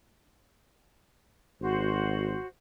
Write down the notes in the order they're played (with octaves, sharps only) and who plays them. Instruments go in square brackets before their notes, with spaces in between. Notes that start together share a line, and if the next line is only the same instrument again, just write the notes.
[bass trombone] G#1 [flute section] F#4 C5